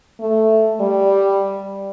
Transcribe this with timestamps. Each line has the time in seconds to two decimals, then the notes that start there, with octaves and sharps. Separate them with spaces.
0.21 A3
0.80 G3